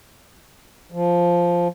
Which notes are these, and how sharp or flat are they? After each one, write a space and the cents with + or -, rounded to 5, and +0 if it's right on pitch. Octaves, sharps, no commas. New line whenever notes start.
F3 -5